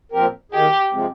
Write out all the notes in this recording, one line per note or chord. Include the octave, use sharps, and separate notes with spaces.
A#2 F3 C4 G4 A#4
D#3 A#3 D#4 G4 G#4
C3 F3 G#3 C4